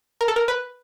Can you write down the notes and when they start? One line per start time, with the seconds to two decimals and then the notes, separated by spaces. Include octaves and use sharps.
0.21 A#4
0.28 A4
0.36 A#4
0.48 B4